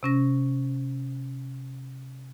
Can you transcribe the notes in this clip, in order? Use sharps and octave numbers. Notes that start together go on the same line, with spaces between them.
C3 C#4 A#6